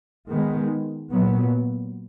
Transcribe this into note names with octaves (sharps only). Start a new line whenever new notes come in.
D#3 G#3 B3
A#2 F#3 B3